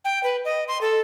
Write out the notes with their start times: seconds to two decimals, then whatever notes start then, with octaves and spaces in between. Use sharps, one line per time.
0.05 G5
0.24 B4
0.45 D#5
0.68 C6
0.81 A4